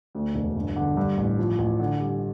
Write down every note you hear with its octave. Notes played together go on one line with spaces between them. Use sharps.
D2
E1
G1
D3
G2
A1
F3
A1
D3
G3